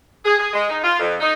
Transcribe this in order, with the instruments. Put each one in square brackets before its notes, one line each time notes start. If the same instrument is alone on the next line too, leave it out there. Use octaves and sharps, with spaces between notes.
[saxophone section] G#4
G#4
G#3
D#4
F4
F2
D#4